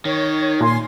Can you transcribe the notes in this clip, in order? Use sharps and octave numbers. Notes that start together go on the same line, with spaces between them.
D#3 C#5
A#2 G#5 C6